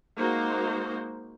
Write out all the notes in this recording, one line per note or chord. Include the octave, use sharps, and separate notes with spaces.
G#3 A#3 D#4 F#4 C5